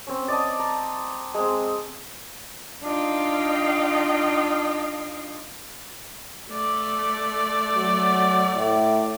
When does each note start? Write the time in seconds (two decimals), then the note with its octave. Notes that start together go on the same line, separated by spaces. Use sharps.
0.07 C4 C#4
0.28 D5 D#5 A5
0.59 A#5
1.34 G#3 C4
2.82 D4 D#4 F4 D#5 F5 G5
6.51 A3 D5
7.76 F#3
8.56 A2